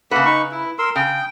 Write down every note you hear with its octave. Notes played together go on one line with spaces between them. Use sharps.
C#3 A#3 B4 E5 F#5
D#4 C#6
E4
A#4 C6 E6
C#3 G5